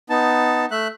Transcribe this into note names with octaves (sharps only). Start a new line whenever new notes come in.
B3 D#4 A5
A3 E5 F#6